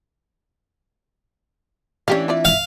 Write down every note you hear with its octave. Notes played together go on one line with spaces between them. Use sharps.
E3 C#4 D4 G4 F5
C4 F4 D5 E5
F5